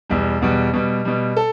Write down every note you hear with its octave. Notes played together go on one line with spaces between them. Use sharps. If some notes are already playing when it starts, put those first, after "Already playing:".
E2 B2 G3
E2 B2 G3
B2 G3
B2 G3
A4